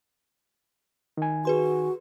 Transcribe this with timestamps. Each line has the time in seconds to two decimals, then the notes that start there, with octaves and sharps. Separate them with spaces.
1.17 D#3 G#5
1.45 F#4 G#4 B4 C6